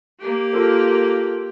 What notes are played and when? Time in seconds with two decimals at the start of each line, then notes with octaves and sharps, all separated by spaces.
0.19 A#3 G4
0.53 F4 A4 A#4